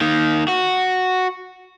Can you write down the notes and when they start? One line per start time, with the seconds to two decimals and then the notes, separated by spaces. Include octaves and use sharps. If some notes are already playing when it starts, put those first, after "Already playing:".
0.01 D#3 A#3
0.48 F#4